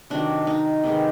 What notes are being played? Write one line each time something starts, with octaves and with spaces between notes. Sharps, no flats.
C3 D#3 F#3 D4
D#4
C3 D#3 G#3 B3